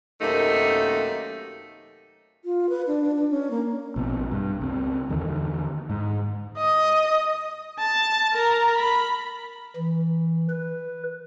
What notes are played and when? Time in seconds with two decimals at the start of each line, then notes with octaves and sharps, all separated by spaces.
0.21 F#2 C3 D#3 A3 A#3 D#4
2.45 F4
2.69 B4
2.87 D4
3.02 D4
3.15 D4
3.30 C#4
3.51 A#3
3.96 A#1 B2 C4
4.31 G2
4.61 C#2 C4
5.09 E2 D3 D#3
5.89 G#2 G#3
6.58 D#5
7.79 A5
8.33 A#4 A#5
8.77 B5
9.76 E3
10.50 B4